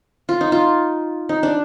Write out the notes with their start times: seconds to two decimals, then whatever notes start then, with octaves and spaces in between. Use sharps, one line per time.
0.29 F4
0.41 D#4
0.52 F4
1.29 D#4
1.43 D4